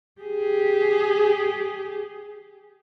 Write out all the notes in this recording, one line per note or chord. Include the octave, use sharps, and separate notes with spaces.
G4 G#4